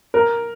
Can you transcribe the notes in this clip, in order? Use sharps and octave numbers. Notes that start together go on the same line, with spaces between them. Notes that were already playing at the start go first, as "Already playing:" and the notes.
A#4